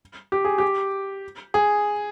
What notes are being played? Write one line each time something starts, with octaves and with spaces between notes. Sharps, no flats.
G4
G#4
G4
G#4